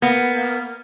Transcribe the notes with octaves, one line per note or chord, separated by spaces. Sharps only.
A#3 B3